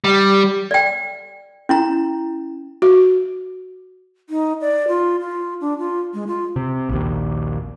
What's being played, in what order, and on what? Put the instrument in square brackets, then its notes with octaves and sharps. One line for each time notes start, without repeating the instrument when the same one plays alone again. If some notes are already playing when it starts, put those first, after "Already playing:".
[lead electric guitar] G3
[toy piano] D5 G5
C#4 E4 A#5
[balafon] F#4
[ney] D#4
D5
F4
F4
D4
F4
G#3
F4
[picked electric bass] C3
A#1 D#2